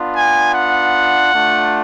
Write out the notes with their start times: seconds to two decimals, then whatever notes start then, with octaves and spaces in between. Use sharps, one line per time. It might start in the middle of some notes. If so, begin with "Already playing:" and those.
Already playing: B3 D4 F4
0.14 G#5
0.54 F#5
1.35 A3 D4 F4